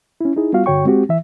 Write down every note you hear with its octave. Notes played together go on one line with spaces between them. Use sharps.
C#4 E4
D#4 E4 G#4
G3 B3 F4 F#4 F5
G2 D3 F#4 C#5 G5 C#6
G#3 C4 F#4 G4
E3 E5